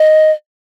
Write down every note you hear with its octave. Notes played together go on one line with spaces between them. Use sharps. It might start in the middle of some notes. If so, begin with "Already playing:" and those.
Already playing: D#5